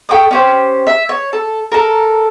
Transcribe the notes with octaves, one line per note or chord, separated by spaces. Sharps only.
A4 G5 C#6 D#6
C#4 G4 C5
E5
C#5
A4
A4 A#4